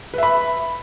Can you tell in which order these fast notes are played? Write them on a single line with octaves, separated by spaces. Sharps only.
B4 E5 B5